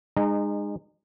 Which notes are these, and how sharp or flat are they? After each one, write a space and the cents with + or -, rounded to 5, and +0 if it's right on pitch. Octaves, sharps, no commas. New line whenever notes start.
G#3 -20 D#4 -35 A#5 +0